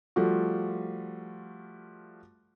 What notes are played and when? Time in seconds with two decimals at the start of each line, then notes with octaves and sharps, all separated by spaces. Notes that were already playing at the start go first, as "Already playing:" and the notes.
0.16 F3 G3 A3 F4 F#4